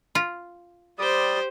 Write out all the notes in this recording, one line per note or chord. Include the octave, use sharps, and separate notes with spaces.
F4
G3 G4 C5 D5 D#6